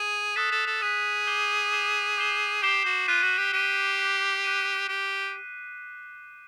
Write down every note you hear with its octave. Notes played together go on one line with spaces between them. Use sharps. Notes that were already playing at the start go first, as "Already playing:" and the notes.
Already playing: G#4
A4 D#6 F#6 B6
A4
A4
G#4 D#6 F#6 B6
D6 G6 C7 E7 G7
D6 G6 C7 E7 G7
D6 G6 C7 E7 G7
G4 D6 G6 C7 E7 G7
F#4
F4 F#6 B6 D#7
F#4
G4
G4 F#6 B6 D#7
F#6 B6 D#7
F#6 B6 D#7
G4